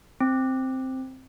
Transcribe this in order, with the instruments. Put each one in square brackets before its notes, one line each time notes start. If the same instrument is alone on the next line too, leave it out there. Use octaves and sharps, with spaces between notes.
[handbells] C4